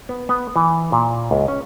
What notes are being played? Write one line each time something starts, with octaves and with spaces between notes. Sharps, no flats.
B3
B3
E3
A#2
C#2
C#4